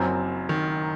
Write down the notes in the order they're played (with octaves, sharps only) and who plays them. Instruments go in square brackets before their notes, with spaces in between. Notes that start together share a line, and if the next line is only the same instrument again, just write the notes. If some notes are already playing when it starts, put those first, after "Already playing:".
Already playing: [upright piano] F#1 F#2 F#3 C4
[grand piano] D#3